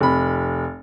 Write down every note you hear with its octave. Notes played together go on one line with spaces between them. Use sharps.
F1 B5